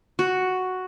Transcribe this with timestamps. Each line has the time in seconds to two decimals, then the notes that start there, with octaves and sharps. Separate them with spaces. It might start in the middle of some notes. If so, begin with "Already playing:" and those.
0.19 F#4